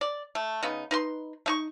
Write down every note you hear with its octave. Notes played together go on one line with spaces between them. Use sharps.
D5
A3
C#3 B3 D#4
D#4 B4 C6
A3 D#4 C#6